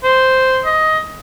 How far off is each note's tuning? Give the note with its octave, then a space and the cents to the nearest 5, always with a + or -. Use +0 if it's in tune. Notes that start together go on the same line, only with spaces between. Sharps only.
C5 -5
D#5 +15